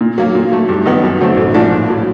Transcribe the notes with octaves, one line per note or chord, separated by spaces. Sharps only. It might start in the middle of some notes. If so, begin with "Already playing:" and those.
A#2
F#3 A#3
A#2
F#3 A3
G2
D#3 F#3 B3 D#4
F#2
D3 F#3 A3 C4
A1
G#2 F3 A3 D4
A#1
A2 F#3